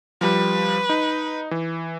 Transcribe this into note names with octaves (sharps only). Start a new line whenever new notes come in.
F3 G3 B4
D#4
E3